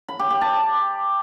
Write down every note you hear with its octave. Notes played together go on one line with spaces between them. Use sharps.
B5
G4
G4
A5